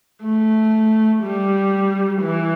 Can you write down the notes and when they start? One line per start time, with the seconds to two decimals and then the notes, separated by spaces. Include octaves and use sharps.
0.22 A3
1.23 G3
2.22 E3